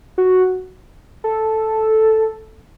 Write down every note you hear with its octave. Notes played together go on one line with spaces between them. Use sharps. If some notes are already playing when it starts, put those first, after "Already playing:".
F#4
A4